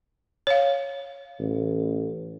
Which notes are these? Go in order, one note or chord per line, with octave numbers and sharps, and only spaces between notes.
C#5 F5
A1